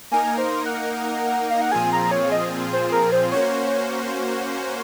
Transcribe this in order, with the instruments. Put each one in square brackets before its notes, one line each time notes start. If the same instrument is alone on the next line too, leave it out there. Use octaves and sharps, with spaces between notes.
[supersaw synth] A#3 D#4 A#4 [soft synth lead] G#5
[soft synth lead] C5
F#5
F5
F#5
[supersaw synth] A#2 F3 C4 F4 G#4 [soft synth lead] G#5
[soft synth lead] A#5
C#5
D#5
C5
A#4
C5
[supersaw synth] A#3 C#4 F#4 C5 [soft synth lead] C#5